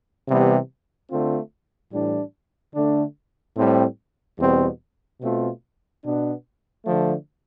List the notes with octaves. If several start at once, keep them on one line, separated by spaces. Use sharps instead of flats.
C3 E3 G3 B3
D3 A3 C4 F4
A2 E3 G3 D4
D3 A3 D4
A2 G3 C4
E2 B2 G3 C4
B2 A3 C4 F4
B2 B3 D4
D3 F3 A3